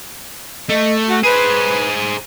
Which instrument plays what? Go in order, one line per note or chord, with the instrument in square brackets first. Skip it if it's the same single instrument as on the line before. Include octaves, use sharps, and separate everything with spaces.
[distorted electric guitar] A3 [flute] D#5
[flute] F#4
[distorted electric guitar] G#4 C5 [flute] B4